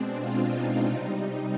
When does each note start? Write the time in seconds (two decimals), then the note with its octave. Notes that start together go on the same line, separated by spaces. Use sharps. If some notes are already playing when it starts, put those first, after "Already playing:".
Already playing: B2 G#3 C4 D4
0.19 F4
0.52 D#4
0.85 C3 G3